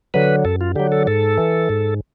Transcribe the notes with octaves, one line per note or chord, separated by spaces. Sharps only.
D3 F#3 B4
F#2 A4
F4
D3 F#3 G4
A4
G#2 A4
E3
G#2